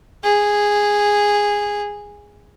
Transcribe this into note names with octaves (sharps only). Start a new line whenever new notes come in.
G#4